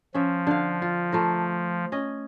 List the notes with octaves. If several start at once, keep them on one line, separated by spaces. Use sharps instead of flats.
F3 C#4 E5
D3 F5
F4
A3 F4 A#4
C#4 D#5